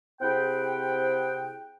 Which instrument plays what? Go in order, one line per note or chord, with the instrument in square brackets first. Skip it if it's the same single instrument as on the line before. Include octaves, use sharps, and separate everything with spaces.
[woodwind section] C3 C4 E4 G#4 F#5 G5